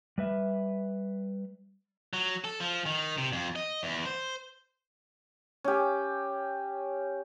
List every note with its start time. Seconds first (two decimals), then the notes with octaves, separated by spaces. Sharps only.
0.18 G3 B4 E5
2.13 F#3
2.45 A4
2.60 F3
2.86 D#3
3.18 C3
3.33 F2
3.56 D#5
3.83 E2
4.06 C5
5.64 C#4 G4